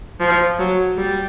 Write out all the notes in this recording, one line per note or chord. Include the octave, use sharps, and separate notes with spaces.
F3
F#3
G3